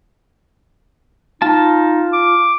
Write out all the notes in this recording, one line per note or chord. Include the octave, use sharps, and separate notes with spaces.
D#4 F4 A5
D6